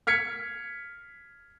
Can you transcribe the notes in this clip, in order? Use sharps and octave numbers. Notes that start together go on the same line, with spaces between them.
F6 G#6 B6 C#7